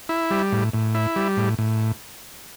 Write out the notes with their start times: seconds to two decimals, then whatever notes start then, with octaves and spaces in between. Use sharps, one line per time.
0.09 E4
0.31 G3
0.52 A2
0.73 A2
0.95 E4
1.16 G3
1.37 A2
1.58 A2